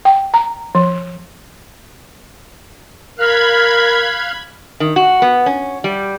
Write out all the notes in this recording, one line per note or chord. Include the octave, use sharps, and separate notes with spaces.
G5
A#5
F3
A#4 F5 B5 F6 F#6 G#6
D#3
F#4
B3
C#4
G3